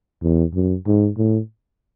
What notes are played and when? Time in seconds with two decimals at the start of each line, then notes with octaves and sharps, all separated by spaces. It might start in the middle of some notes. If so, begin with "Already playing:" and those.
0.22 E2
0.54 F#2
0.87 G#2
1.17 A2